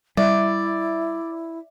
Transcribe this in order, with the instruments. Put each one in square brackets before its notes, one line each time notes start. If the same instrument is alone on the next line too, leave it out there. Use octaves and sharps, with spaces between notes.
[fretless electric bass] G3 [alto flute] E4 [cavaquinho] D5 [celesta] E5